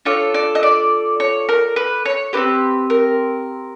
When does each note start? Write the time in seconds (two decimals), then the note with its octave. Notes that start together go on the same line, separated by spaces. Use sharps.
0.05 D4 F4 A4 C#5
0.34 D5
0.55 D#5
0.63 D5
1.20 C#5
1.49 A#4
1.76 B4
2.05 C#5
2.33 C4 D#4 G4 B4
2.90 A#4